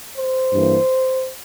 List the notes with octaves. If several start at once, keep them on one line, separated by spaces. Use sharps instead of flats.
C5
G2 E3 A#3